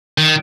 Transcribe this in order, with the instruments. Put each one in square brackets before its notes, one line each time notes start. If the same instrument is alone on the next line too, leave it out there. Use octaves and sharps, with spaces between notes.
[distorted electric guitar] D#3